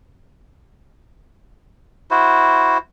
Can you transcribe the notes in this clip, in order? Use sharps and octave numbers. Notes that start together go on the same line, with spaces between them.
E4 F#4 C5